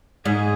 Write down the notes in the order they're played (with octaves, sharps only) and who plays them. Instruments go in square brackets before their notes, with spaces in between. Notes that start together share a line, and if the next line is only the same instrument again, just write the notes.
[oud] G#2 [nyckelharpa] G#4